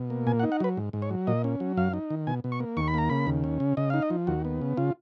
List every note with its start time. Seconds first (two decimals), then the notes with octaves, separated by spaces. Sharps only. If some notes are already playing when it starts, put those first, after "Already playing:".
Already playing: B2
0.10 A#3
0.27 A#2 G#5
0.40 F#5
0.43 D#4
0.52 F#5
0.60 F#3 B4
0.77 G#2
0.93 G#2
1.02 C#5
1.11 F#3
1.27 A#2 D#5
1.44 C#4
1.60 F#3
1.77 F#2 F5
1.94 D#4
2.10 D#3
2.27 B2 G#5
2.44 B2
2.52 C#6
2.60 A#3
2.77 D#2 C#6
2.88 B5
2.94 A#3 A#5
3.09 C#3 B5
3.27 D#2
3.44 C#4
3.60 C#3
3.77 C#3 D#5
3.90 D#4 F5
4.02 D#5
4.10 F3
4.27 D#2 F#4
4.45 B3
4.62 C#3
4.77 C#3 F4